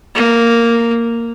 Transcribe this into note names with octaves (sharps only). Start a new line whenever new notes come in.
A#3